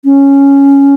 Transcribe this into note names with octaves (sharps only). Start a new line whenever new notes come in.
C#4